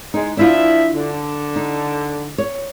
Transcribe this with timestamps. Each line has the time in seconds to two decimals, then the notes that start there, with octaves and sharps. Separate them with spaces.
0.14 G#3 D#4
0.37 F3 D4 E4 F4 E5
0.93 D3
1.56 D#4
2.38 C#5